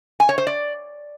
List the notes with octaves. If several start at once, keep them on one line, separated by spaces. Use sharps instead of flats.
G#5
C#5
C5
D5